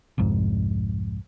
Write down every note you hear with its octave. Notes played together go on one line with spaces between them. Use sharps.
C2 F2 G#2